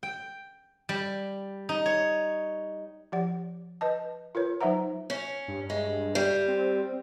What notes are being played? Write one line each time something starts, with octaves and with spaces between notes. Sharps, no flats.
G5
G3
D#4
C#5
F3 G4 D5 F#5
B4 D#5 A5
F4 A#4 B4 C#5
F#3 D#4 C5 E5 F#5 A#5
C#4
G2
G#3
G3
C4